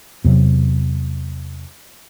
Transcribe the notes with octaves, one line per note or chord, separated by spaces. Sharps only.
E2 C3 F#3